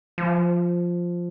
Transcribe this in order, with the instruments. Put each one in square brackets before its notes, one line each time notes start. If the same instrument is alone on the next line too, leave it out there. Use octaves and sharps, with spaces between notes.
[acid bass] F3